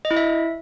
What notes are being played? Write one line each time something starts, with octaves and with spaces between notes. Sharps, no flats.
D#5
E4
E5